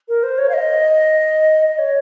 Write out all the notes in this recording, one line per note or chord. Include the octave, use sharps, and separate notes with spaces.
A#4
C5
C#5
F5
D#5
D#5
C#5